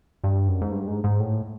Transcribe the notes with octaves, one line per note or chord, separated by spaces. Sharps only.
G2
F#2
G#2
G2
G#2
G#2
A2